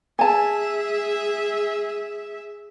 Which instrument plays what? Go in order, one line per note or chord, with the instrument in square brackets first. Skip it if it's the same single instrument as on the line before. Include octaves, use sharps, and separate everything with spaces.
[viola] G#4 E5 [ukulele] G#5 A5